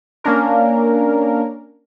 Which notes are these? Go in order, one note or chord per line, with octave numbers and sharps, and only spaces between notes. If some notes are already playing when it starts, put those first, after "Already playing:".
A#3 C#4 D4 A#4